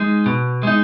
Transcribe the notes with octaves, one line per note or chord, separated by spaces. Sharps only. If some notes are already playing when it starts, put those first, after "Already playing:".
Already playing: G#3 D#4
B2
G#3 D#4